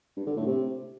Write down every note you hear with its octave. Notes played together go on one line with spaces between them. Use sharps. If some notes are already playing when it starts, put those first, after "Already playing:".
G2
D3
A2
C3